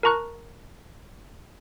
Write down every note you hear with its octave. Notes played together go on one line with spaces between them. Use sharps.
A#4 A5 A#5 C#6 F#6